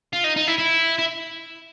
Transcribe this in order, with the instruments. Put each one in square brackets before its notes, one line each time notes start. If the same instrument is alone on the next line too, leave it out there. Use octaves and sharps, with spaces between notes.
[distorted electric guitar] F4
D#4
D#4
E4
E4
E4